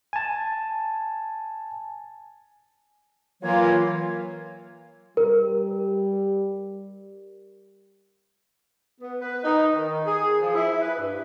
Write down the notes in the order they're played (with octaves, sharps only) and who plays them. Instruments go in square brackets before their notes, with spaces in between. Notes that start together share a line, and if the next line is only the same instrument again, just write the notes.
[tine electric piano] G#5 A5
[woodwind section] E3 F#3 C#5 [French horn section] A#3 F4
[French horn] G3 [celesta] A#4
[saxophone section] B3
B4
D#4
D#3
G#4
F3
E4
B4
G2